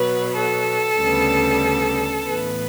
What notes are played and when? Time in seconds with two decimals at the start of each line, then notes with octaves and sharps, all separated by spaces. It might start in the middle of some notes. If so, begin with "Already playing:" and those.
Already playing: B2 F#3 B3 B4
0.36 A4
0.99 D2 C#3 G3 B3
2.25 A2 E3 B3 B4